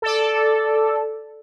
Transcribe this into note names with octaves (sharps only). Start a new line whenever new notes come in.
A4 D5